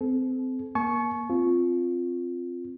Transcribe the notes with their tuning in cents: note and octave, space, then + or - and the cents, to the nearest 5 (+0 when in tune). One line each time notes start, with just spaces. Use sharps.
C4 -25 A4 -35
A#3 +25 A5 -45 C#6 +0
C4 +0 F4 +0